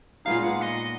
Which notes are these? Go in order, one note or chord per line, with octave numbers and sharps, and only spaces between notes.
A#2 G#3 B3 D#4 F5
F#5
D#5